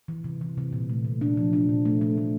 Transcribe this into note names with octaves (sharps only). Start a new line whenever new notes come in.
E3
C3
E3
C3
A#2
A3
A#2
D4
F3
D4
A#2
A3
A3
A3